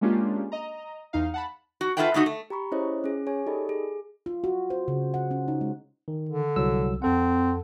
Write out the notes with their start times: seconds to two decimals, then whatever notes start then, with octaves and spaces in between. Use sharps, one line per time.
0.01 G#3 A#3 C#4 D4 F4 G4
0.52 D#5 A#5
1.13 E2 D#4 F5
1.34 F#5 A5 B5
1.81 F#4
1.97 F4 A4 B4 E5 F#5 G5
2.14 D3 A3 D#4 F#4
2.26 A3
2.50 G4 A#5 B5 C#6
2.72 C#4 E4 G#4 C5 C#5 D#5
3.04 C#4 G#4
3.27 G#4 C#5 G#5
3.46 D#4 G4 A4 D5 D#5 B5
3.69 G#4
4.26 F4
4.44 F#4
4.70 C5
4.88 C#3
5.14 F#5
5.31 C#4
5.48 D#4
5.61 G#3
6.08 D#3
6.29 D3
6.56 C2 F#3 E6
7.02 F2 C4 A4 F#5